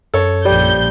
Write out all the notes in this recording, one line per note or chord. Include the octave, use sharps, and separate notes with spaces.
F#2 A4 C#5
A#1 F3 G3 G6